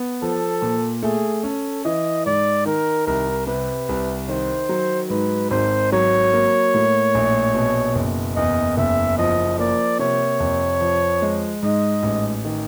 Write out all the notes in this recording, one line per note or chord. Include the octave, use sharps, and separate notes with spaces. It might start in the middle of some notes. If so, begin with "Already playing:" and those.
Already playing: B3
F3 A4
A#2
A3 G#4
C#4 A4
E3 D#5
G#2 D5
D#3 A#4
C2 A#4
C3 B4
C2
D#3 C5
F#3
G#2 B4
G#1 C5
F#3 C#5
A#3
A2
A#1
B2
F#1
E2 D#5
F#1 E5
F3 D#5
A#3 D5
C3 C#5
F2
F3
G#3
G#2 D#5
A1
D#3